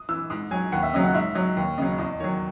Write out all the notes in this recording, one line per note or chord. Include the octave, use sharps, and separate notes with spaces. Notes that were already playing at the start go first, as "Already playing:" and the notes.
Already playing: D#6
E3 E6
G#2 D#6
F#3 G#5
D#2 F#5
E5
C#3 F#3 D#5
F#5
G#2 E5
F#3 D#5
D#2
C#3 F#3 D#5
E2 D#5
D#3 F#3 C#5